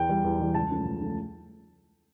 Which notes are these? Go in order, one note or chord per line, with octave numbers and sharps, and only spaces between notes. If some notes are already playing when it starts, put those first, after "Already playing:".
Already playing: E2 G5
E3 G3
E2
E3 G3
C#2 A5
C#3 F3 A3
C#2
C#3 F3 A3